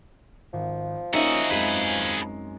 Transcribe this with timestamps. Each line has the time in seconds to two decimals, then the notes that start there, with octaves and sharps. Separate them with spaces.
0.53 G#1 F3
1.13 A#3 C#4 D#4 F4 F#4 G#4 E5
1.51 F#2 G#3 C4 G#4 B4